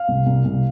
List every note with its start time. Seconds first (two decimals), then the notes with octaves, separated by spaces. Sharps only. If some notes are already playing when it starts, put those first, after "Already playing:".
Already playing: F5
0.08 C2
0.26 C2
0.45 C2